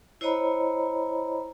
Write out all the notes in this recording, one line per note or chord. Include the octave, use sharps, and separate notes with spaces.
E4 C5 C#5 D#5 A#5 B5